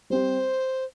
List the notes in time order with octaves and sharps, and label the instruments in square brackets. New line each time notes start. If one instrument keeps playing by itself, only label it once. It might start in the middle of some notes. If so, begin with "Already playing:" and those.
[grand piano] G3 C4 G4 [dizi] C5